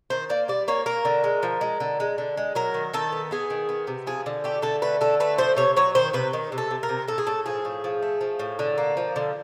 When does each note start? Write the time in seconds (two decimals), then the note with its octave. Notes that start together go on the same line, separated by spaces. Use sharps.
0.10 D#3 C5
0.29 A#3 D5
0.48 G3 D5
0.68 A#3 C#5
0.86 A#3 A#4
1.05 D3
1.24 G#3
1.43 F3
1.61 G#3
1.80 D3
2.00 G#3
2.18 D3
2.37 G#3
2.55 F#3 A#4
2.74 D#3
2.94 D#3 A4
3.12 B3
3.31 B3 G#4
3.50 D#3
3.69 B3
3.87 C3
4.07 F3 G#4
4.26 D3
4.44 A3 G4
4.62 D3 A4
4.82 A3 B4
5.01 D3 A4
5.20 A3 B4
5.38 F3 C5
5.57 C3 C#5
5.76 F#3 C#5
5.95 D#3 C5
6.13 C3 B4
6.33 D#3
6.52 C3
6.58 A4
6.71 C3
6.83 A#4
6.89 C3
7.08 A2 A4
7.18 G#4
7.27 A2 A4
7.46 F3 G#4
7.65 A2
7.84 F3
8.02 A3
8.21 F3
8.39 A2
8.59 D3
8.78 A#3
8.97 F3
9.16 D3